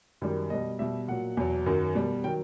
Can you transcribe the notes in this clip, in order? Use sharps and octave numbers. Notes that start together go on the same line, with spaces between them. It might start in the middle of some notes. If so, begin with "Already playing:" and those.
F#2 D#3 G3
B2 G3 D#5
B2 G3 E5
A#2 F#3 F#5
E2 B2 F#3
F#2 D#3 F#3
B2 G3
D#3 F#3 G5